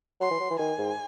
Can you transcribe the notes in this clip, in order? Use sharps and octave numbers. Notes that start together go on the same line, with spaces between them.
F#3 C6
E3
F#3
E3
D#3 G#5
G#2